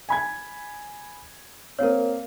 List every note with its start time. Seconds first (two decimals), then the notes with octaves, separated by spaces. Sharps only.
0.09 G#5 B5 G#6
1.79 A#3 C4 A#4 C#5 F5